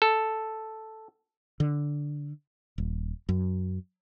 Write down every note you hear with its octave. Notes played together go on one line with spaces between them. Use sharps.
A4
D3
D#1
F#2